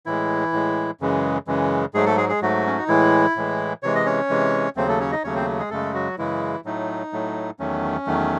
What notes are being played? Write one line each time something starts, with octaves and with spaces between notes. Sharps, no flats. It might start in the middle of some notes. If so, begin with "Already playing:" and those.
A2 E3 G#3 E4
A2 G#3
F#2 C#3 E3 G#3
F#2 C#3 E3 G#3
G#2 F#3 G#3 A3 G#4
A3 A4
G#3 G#4
G#3 G#4
G#2 F#3 A3 F#4
C#4
D#4
A2 E3 G#3 E4
A2 E3 G#3
C3 E3 G#3 C#5
D#5
C#4 C#5
C3 E3 G#3
D#2 C#3 F#3 A3 C4 C5
A3 A4
C#4 C#5
D#4 D#5
D#2 C#3 F#3 A3 C#4 C#5
C4 C5
G#3 G#4
F#2 C#3 G#3 A3 A4
F#3 F#4
F#2 C#3 E3 G#3 E4
A2 F#3 A3 D#4
A2 F#3 A3
E2 D#3 F#3 A3 C#4
E2 D#3 F#3 A3